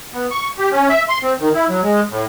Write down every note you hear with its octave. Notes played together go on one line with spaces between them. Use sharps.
B3
C#6
G4
C#4
E5
C6
C4
D#3
E4
F#3
G#3
A2